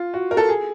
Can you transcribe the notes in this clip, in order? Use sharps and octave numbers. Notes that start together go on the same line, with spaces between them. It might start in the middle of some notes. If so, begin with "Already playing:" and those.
Already playing: F4
F#4
A#4
A4
G#4